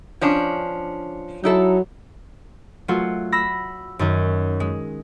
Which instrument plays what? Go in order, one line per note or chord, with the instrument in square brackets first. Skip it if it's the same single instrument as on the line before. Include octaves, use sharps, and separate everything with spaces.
[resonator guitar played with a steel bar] F3 C#4 D4
[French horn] F#3 [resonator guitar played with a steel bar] D#4 E4 A4
[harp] F#3 A3 F4 F#4
B5 E6 A#6 B6
F#2 D#3 C#4
G#3